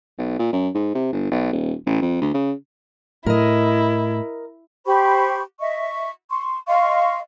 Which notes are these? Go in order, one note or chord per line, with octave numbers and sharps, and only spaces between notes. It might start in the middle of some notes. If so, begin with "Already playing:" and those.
B1
A#2
F#2
G#2
C3
G1
B1
D#1
A1
F2
D2
C#3
A2 E4 A#4 D#5
G4 C5 B5 C#6
D#5 E5 C#6
C6 C#6
D#5 F5 C6 C#6